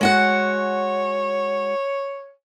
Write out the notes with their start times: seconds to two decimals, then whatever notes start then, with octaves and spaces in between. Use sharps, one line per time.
0.01 G#3 F#4 C#5 F#5